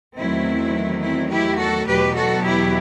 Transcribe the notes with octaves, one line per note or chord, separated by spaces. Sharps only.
E2 D#3 F#3 A3 C4 E4
C4 E4
E4 G4
F#4 A4
E2 B2 F#3 G4 B4
F#4 A4
E4 G4